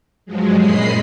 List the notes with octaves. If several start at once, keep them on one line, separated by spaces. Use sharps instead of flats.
G2 F3 F#3 G#3
F#2 A#2 G#3 D#5 B5 C7